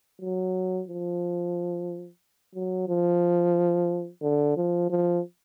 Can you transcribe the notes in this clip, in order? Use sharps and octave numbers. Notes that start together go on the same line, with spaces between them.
F#3
F3
F#3
F3
D3
F3
F3